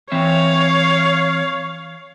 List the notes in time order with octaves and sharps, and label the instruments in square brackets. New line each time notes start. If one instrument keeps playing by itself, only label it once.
[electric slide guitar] E3 C4 E5 [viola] C#5 F5